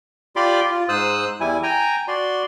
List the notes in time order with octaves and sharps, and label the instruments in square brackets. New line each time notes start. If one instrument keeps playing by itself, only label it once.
[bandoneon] F4 G4 D5 B5 C6 D6
F4
G#2 C5 D#6 E6 F#6
E2 G3 E4 G#5
G5 G#5 A#5
F#4 D5 C6